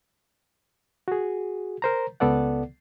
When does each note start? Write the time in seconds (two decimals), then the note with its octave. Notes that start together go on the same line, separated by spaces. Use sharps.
1.08 F#4 G#4
1.82 A#4 C5 A#5
2.20 C#2 B3 A4 D5 F#5